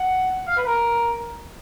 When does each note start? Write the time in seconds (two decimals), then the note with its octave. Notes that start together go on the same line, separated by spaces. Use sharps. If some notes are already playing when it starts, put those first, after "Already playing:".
Already playing: F#5
0.48 F5
0.57 B4
0.67 A#4